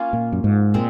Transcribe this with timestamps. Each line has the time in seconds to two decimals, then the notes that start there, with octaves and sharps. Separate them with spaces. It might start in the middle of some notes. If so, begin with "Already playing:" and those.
Already playing: A#3 C#4 F4
0.13 A#2
0.32 F#2
0.44 G#2
0.74 A#2 G#3 C4